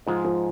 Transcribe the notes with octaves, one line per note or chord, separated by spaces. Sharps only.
G#2 F3 G#3 F4
F3